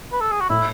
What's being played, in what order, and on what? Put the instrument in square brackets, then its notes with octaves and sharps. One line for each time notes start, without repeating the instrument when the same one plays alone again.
[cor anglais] B4
A4
G#4
F#4
[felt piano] A2 [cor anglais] E4